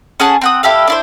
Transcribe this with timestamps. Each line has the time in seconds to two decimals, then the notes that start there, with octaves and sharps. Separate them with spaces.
0.20 C#4 G#4 F#5 A5
0.41 C4 F#5 D#6
0.63 E4 G4 A4 F5
0.88 D4 E4 C5